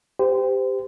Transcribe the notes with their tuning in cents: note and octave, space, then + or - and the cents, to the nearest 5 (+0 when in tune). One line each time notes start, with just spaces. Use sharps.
G4 +10 C5 -30